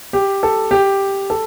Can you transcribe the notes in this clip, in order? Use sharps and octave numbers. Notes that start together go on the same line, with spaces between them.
G4
A4
G4
A4